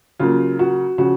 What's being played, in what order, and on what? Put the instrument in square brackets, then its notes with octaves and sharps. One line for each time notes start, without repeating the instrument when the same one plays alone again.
[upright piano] C#3 F#3 A#3 F4
F#4
C#3 F3 F#4